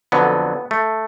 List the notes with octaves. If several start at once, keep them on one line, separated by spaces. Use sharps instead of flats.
F2 D3 F#3 B3
A3